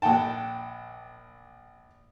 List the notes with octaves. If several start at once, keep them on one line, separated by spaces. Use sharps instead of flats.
A#1 F#5 G5 A5